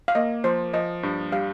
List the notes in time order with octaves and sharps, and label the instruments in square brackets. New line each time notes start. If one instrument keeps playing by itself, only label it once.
[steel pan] F5
[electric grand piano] A#3 [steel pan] D#5
[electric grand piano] F3 [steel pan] C5
[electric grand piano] F3 [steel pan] D#5
[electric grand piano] G2
[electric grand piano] G3 [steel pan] F5